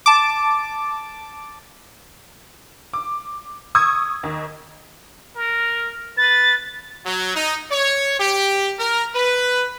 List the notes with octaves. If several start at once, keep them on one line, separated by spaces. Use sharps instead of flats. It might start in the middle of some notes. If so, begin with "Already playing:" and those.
A5 D6
D6
C#6 D#6 E6 G#6
D#2
A#4
B4 A6
F#3
D#4
C#5
G4
A#4
B4